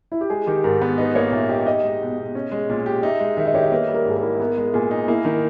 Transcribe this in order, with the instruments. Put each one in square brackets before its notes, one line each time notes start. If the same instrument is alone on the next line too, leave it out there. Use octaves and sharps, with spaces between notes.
[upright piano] E4
G4
[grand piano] G#3 [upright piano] G#4
[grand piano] D#3 [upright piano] G4
[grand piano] G#2 [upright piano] A#4
[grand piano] B3 [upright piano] A#4
[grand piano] D#4 [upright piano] B4
[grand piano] A#3 [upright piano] C#5
[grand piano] A#2 [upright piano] E5
[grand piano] G4 [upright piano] D#5
[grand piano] D#4 [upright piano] D#5
[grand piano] G#3
B2
B2
C#4
G#3
A#2
G4
[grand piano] D#4 [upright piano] E5
[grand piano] G#3
[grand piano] D#3 [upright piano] E5
[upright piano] D#5
[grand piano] G4 [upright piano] C#5
[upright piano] D#5
[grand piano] A#3 [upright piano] B4
[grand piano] G3
[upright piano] A#4
[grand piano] G#2 [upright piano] G#4
[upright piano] A#4
[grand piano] E4
[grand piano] B3 [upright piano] A#4
[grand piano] G#3
[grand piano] A#2 [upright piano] G#4
[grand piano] D#4
[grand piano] A#3 [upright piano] E4
[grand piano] D#3 [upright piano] D#4